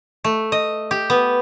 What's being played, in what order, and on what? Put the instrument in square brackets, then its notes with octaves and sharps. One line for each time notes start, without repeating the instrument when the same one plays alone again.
[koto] A3
D#5
G4
B3